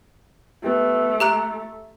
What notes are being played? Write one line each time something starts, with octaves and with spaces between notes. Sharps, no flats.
A3 B3 G4
G4 E5 A#5 F#6